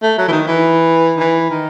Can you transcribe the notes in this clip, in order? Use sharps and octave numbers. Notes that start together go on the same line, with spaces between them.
A3
F#3
E3
D#3
E3
D#3
E3
D#3